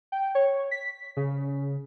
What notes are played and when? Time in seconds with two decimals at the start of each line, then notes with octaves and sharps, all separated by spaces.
0.12 G5
0.35 C#5
0.71 B6
1.17 C#3